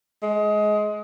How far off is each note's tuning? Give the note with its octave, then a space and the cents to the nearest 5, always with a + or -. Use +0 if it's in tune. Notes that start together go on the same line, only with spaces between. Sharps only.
G#3 +20